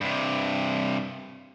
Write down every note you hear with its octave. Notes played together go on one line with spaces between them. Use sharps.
G2 C3